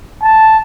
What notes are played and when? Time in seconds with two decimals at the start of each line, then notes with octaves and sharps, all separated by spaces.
0.23 A5